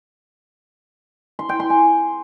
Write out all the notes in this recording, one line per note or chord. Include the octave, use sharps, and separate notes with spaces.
C6
G5
C6
G#5